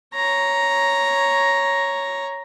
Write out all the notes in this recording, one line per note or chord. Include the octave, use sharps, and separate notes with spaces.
C#5 A#5